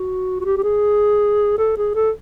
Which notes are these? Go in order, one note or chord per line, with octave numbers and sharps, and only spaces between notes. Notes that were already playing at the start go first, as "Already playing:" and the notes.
Already playing: F#4
F#4
G4
G4
G#4
A4
G#4
A4